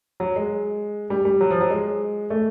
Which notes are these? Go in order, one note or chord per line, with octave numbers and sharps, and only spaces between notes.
F#3
G#3
G3
G3
F#3
F3
F#3
G#3
A3